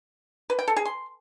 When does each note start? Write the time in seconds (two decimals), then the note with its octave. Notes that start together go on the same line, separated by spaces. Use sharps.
0.50 B4
0.59 G5
0.68 A4
0.76 G#4
0.85 C6